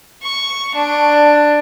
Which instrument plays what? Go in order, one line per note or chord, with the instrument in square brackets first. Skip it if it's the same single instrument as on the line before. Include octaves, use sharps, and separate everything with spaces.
[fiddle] C#6
D4